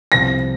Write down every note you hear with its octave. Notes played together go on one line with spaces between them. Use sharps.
C2 C3 F3 A#6